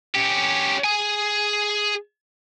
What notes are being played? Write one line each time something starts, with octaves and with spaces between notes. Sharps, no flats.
C#4 G4
G#4 G#5